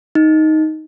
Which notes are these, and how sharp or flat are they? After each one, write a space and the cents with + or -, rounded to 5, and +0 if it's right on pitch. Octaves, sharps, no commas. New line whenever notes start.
D#4 +5